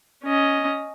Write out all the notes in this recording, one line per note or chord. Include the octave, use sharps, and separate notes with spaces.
C#4 D#5